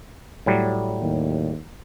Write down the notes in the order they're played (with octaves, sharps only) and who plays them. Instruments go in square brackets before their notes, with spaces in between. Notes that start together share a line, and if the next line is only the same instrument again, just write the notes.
[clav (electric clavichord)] A2 F#3 G3
[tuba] D#2